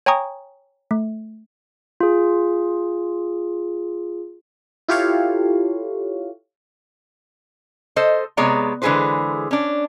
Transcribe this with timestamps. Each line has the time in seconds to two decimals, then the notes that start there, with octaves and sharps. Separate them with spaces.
0.06 C#5 G5 G#5 A#5 C#6 D#6
0.91 A3
2.00 F4 G#4
4.88 E4 F4 G4 A4 C#5 F5
7.96 A4 C5 D#5
8.37 C3 G#3 B3 C#5 D5 A#5
8.82 D3 E3 G#3 G#4 B4 C5
9.51 C#4 D4